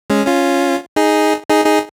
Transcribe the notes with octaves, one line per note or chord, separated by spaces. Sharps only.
G#3 C#4
C#4 F4
D#4 G#4
D#4 G#4
D#4 G#4